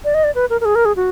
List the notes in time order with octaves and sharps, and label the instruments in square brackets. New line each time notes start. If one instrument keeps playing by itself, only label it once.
[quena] D5
D#5
D5
B4
A#4
A#4
G#4
A#4
G#4
F#4